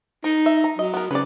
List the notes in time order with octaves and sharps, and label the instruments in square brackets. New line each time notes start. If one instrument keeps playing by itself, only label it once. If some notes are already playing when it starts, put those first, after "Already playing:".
[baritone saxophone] D#4 [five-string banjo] A#4
[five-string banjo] E5
A#5
[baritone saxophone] F#3 [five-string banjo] D#5
[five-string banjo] B3 A#4
[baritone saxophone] C#3 [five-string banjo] B4 D5